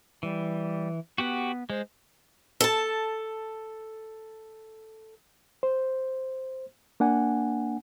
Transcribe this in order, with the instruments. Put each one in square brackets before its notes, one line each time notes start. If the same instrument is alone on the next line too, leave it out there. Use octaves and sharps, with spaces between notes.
[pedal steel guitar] E3 [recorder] G3
[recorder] B3 [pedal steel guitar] F#4 G4 F#5
[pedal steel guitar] G#3 [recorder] C5
[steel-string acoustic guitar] A4 A5
[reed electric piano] C5
A#3 D4 F#5 G#5